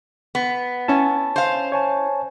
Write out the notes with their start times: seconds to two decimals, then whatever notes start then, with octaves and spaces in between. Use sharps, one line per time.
0.35 B3
0.88 C#4 E4 A5
1.36 C5 F5
1.72 C#5 G#5 A5